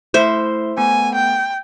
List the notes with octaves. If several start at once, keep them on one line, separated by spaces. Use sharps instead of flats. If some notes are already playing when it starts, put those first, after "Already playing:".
A3 E4 C5 E5 C6
A3 B3 G#5
G5